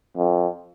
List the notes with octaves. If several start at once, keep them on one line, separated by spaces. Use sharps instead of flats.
F2